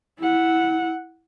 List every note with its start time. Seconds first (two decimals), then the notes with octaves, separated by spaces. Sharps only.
0.19 E4 F#5